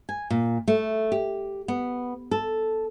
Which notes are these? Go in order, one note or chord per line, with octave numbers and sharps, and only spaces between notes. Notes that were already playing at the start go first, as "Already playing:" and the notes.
G#5
A#2
A3
G4
B3
A4